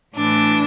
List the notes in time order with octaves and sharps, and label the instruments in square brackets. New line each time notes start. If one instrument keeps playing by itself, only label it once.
[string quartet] A2 E3 D4